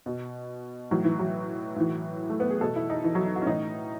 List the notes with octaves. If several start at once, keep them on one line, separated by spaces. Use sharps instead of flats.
B2
A2 E3 F#3
E3
F#3
A2 E3
A3
B3
G#4
B2 A4
E4
D#4
E3
F#3
D#4
F#4
C#4
A2 E3 D#4